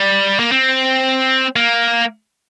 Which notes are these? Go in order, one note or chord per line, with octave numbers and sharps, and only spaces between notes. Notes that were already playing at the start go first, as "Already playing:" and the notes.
Already playing: G3
A#3
C4
A#3